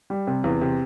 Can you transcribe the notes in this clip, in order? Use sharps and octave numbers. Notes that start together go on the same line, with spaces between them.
G3
C3
E2
C3